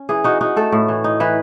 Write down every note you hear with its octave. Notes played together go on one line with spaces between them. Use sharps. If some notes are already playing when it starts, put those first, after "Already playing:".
Already playing: C#4
E3 G#4
D#4 F#4
D#4 F#4
A3 A4
A2
E3
D#4
E3 B4